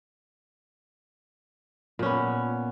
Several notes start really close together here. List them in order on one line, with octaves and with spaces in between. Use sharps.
A#2 C#4 B3